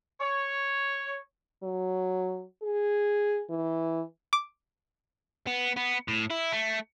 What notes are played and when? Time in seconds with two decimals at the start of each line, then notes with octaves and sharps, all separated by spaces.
0.21 C#5
1.63 F#3
2.62 G#4
3.50 E3
4.33 D6
5.47 B3
5.77 B3
6.08 A2
6.30 E4
6.52 A3